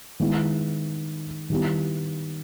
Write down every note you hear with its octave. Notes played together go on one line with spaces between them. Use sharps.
D#3 G#3 B3 E4
D#3 G3 B3 E4 G4